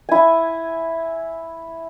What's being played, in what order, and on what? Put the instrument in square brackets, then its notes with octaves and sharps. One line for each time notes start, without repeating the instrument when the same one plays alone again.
[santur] E4 G#5